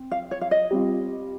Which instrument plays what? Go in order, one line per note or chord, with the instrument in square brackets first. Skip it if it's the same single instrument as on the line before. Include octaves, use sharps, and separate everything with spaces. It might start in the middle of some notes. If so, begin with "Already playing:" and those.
Already playing: [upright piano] C4
[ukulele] F5
C#5
F5
D#5
[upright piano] G3 C4 F4